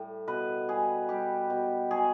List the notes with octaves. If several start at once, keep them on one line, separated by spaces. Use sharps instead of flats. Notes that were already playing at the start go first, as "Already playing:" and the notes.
Already playing: A2 G3
B2 B4
G3 G#4
G3 G4
B2
F#3 G#4